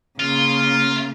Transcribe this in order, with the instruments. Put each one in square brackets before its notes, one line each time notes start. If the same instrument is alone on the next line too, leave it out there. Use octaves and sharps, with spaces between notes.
[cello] C#3 A#3 [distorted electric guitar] F4